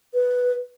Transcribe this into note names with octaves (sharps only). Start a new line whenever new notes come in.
B4